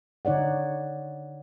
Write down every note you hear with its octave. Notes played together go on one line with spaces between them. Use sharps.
D3 D#4 C#5 D5 F#5